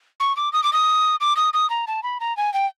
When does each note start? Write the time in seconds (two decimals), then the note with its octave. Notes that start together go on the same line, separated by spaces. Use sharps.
0.20 C#6
0.37 D6
0.53 D#6
0.63 D6
0.73 D#6
1.21 D6
1.37 D#6
1.53 D#6
1.70 A#5
1.87 A5
2.03 B5
2.20 A#5
2.37 G#5
2.54 G5